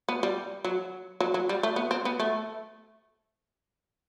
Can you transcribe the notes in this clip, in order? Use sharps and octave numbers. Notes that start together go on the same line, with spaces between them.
B3
G3
F#3
F#3
F#3
G3
A3
B3
C4
B3
A3